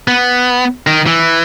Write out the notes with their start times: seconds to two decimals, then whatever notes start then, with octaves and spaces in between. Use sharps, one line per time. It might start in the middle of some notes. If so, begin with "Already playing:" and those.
0.08 B3
0.87 D#3
1.07 E3